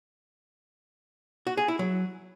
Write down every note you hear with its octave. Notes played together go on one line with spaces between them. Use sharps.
F#4
G#4
E4
F#3